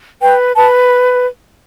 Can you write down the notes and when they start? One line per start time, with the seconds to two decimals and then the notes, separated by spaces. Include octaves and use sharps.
0.22 B4 G5
0.55 B4 A5